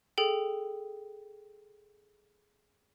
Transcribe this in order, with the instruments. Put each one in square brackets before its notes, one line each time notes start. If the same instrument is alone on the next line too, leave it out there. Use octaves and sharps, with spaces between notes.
[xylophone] G#4 A4 G5